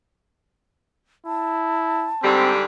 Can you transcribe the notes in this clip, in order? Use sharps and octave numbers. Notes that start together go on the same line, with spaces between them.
E4 A5
G#2 D3 G3 C4